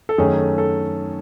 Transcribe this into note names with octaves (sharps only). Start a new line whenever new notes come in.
A4
F#2 D#3 A3 C#4 G#4
A4
A4